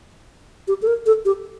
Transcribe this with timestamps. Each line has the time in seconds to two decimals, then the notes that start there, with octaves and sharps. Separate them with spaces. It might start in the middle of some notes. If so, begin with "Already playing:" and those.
0.68 G4
0.82 A4
0.87 A#4
1.06 A4
1.25 G4